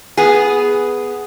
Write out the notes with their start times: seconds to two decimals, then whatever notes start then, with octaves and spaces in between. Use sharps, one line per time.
0.17 B3 G#4